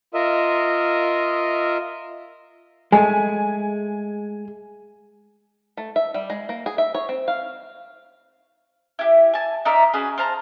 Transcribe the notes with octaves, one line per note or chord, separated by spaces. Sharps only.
F4 A#4 D#5 E5
G#3 A3 G#5
A3
E5
G3
G#3
A#3
G#4
E5
C#5
C4
F5
E4 G4
G#5 A5
D#4 A#4 D5 E5
C#4 F#4 G#4 B4
C5 F5 A5 A#5